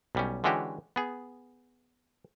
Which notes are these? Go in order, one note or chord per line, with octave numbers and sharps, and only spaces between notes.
B1 G3 C#4
D3 E3 G#3 C#4 F#4 G4
B3 G#4